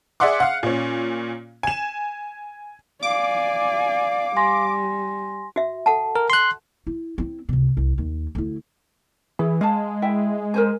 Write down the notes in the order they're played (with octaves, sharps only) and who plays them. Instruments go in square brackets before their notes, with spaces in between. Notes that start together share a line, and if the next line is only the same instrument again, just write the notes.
[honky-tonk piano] G#4 D5 E5 F#5 C6 D6
F5 F#5
A#2 C#4
G#5 E7
[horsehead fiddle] D5 G#5 [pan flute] F5 [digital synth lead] D6
[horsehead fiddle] G3 [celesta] G#5 C6 A#6
[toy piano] F#4 E5
A4 F#5 A5
[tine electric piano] A#4
C6 F#6
[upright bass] E4
C4 E4
C#2 C3
C2
D#2
D2 E4
[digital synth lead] E3 [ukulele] G#4
[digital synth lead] G#3 [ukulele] F5 A5
[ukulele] E4 E5 G5
A#4 C5 G#5